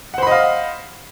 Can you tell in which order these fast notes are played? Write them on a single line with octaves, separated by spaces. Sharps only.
F#5 C5 B5 D#5 F5